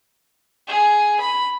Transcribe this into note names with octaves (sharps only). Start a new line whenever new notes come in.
G#4
B5